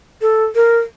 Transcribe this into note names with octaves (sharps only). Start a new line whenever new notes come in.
A4
A#4